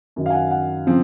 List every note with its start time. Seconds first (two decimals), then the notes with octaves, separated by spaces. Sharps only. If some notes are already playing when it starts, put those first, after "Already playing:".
0.16 F#2 D#3 F#3
0.26 F5
0.30 G#5
0.34 F#5
0.51 F#5
0.87 C#3 F3 C4